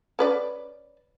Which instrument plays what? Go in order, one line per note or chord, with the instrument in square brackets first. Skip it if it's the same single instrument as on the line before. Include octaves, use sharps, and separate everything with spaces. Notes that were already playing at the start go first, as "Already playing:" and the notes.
[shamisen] C#4 B4 D5